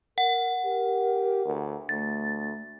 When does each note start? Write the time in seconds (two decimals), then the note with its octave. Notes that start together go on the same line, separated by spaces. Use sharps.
0.18 A#4 F#5
0.65 G4 A#4
1.45 D2
1.89 D2 A3 A6